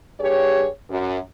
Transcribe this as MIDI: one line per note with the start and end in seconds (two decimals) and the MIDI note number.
0.20 0.67 43
0.20 0.67 67
0.20 0.67 68
0.20 0.67 73
0.90 1.17 42